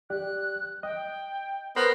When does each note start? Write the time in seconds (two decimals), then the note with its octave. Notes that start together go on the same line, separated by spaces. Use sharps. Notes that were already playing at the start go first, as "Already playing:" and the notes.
0.10 G4 D5 F#6
0.83 D#5 G5
1.76 B3 A#4 C5